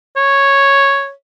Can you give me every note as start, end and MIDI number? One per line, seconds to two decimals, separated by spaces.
0.16 1.11 73